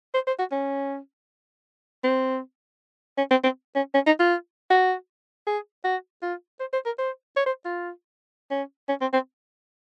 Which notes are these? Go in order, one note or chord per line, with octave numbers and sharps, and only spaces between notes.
C5
C5
F#4
C#4
C4
C#4
C4
C4
C#4
C#4
D#4
F4
F#4
G#4
F#4
F4
C5
C5
A#4
C5
C#5
C5
F4
C#4
C#4
C4
C4